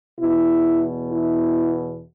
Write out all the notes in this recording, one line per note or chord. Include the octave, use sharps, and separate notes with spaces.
E2 B2 E4
E4